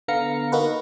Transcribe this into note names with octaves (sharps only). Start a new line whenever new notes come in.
D3 B3 F5 A#5 C#7
A#3 D#4 F#4 B4